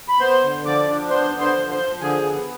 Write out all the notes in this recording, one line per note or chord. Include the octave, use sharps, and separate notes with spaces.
B5
B3 C5 C6
D3
F3 D5 D6
D4
B3 C5 C6
D3
C5 C6
F3
C5 C6
F3
D3 G#4 G#5
B3